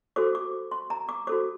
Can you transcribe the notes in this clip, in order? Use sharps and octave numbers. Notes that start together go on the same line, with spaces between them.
F#4 A4 C5 D6
D6
C6
A#5
D6
F#4 A4 C5 D6